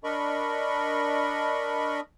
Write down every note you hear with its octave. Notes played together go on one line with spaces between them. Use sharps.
D4 A#4 D#5 B5 C#6